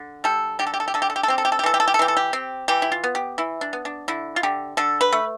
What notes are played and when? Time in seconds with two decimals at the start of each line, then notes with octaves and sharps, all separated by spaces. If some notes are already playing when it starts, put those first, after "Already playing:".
Already playing: D3
0.24 G3 A4
0.59 D3 G4
0.67 A4
0.74 G4
0.80 A4
0.88 G4
0.94 D3 A4
1.02 G4
1.10 A4
1.16 G4
1.23 A4
1.28 C4 G4
1.38 A4
1.45 G4
1.52 A4
1.59 G4
1.64 E3 A4
1.74 G4
1.80 A4
1.88 G4
1.94 A4
1.99 E3 G4
2.08 A4
2.17 G4
2.33 C4
2.68 E3 G4
2.82 E4
2.92 F4
3.04 B3
3.15 G4
3.38 E3 E4
3.61 D4
3.73 B3
3.85 D4
4.08 D3 E4
4.36 F4
4.43 D3 G4
4.77 D3 A4
5.01 B4
5.13 A3